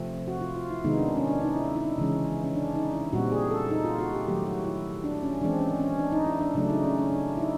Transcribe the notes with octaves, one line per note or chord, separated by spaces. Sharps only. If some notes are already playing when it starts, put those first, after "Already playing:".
Already playing: C3 F3 A3 C4
F#4
F4
F4
E4
C3 D#3 G#3 B3 D#4
D4
C#4
D4
D#4
E4
E4
D#4
C#3 E3 G#3 C#4
C#4
D4
D#4
E4
A#2 G3 C4 F#4
G#4
A4
D#4
F4
F#4
G4
D#3 F#3 A3 G4
F#4
E4
D4
C#4
E3 G#3 C4 D4
C#4
C#4
D4
D#4
E4
D4
C#3 F#3 A3 D4
D#4
C#4
C#4
D4
E4
D#4